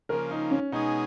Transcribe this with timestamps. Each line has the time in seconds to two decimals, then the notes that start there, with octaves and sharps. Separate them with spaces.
0.09 C#3 F3 A#3 A#4
0.31 D#4
0.51 C#4
0.72 B2 G#3 C#4 D#4 G#4